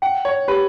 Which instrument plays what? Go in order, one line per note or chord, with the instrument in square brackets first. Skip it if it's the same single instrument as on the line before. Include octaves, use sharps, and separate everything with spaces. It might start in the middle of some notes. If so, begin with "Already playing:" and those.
[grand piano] F#5 [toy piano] G5
[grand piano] C#5
[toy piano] G4 [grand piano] B4